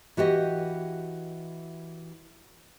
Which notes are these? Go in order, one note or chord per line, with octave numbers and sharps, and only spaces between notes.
E3 F#4 G4 D#5